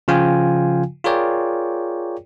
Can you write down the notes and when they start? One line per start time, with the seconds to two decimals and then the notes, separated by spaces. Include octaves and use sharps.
0.08 C#3 F3 F4 F5 G5 G#5
1.04 F4 G#4 A#4 C#5 D5 G5